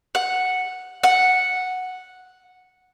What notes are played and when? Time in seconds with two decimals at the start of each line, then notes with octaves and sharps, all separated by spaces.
0.15 F#5
1.03 F#5